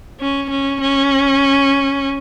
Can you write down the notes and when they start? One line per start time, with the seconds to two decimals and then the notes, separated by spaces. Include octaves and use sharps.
0.20 C#4
0.50 C#4
0.80 C#4